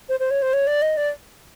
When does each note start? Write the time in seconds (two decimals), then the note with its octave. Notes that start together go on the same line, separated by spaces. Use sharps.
0.09 C5
0.20 C5
0.31 C#5
0.42 C5
0.53 C#5
0.67 D5
0.82 D#5
0.97 D5